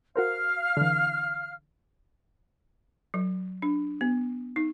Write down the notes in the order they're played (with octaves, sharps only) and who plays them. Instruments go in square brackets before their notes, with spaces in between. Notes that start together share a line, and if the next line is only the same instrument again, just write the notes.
[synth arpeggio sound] F#4 A#4 C5 [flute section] F5 F6
[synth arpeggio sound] D3 E3
[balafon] F#3
D4
B3
D#4